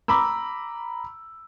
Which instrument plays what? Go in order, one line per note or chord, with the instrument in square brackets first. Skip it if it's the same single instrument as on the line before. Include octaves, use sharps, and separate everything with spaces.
[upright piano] A#5 B5 D6 E6